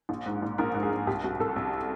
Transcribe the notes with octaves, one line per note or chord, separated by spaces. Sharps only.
A#1
G#2
A#1
A#1 A#4
G#2
G#4
G#2
C2 G4
C2 F#4
C2 A4
C2